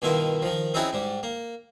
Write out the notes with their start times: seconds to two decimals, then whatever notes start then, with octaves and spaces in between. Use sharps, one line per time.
0.02 G2 B2 D#3 E4 F4
0.42 D#3 F3
0.74 C4 C#4 D#4 E4 F#4 G#4
0.93 G#2 G3
1.23 A#3